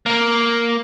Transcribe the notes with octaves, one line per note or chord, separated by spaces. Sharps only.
A#3